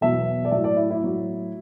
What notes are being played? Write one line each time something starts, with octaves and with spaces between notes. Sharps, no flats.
E2 B2 F#3 E5
D5
A2 F#3 E5
D5
E4
E4
A2 F#3